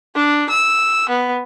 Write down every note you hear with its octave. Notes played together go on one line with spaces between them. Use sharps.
D4
E6
B3